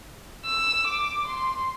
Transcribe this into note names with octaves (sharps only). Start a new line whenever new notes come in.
E6
D6
C6